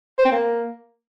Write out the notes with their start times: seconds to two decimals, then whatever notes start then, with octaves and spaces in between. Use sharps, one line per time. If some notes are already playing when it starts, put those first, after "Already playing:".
0.19 C5
0.25 C4
0.32 A#3